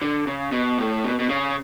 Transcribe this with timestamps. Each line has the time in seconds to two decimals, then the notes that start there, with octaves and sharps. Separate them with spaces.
0.02 D3
0.27 C#3
0.52 B2
0.79 A2
1.04 B2
1.19 B2
1.29 C#3